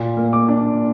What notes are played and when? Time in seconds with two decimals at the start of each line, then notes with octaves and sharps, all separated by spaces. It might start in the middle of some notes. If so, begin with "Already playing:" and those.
Already playing: A#2
0.17 A#3
0.33 D6
0.48 D4